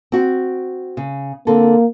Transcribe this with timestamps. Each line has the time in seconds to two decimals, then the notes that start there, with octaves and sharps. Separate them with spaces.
0.12 C4 F#4
0.97 C#3
1.47 D3 A#3 C4 A4